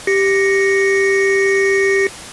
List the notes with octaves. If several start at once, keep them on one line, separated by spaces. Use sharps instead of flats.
G4 A#6 C#7